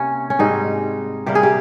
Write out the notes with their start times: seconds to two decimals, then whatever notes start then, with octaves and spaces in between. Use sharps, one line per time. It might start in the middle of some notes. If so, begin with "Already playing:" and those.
Already playing: C3 A#3 C#4
0.30 C#4
0.39 G#2 G3 C4 D#4
1.26 C3 G3 A#3 G4
1.35 G#4
1.43 G4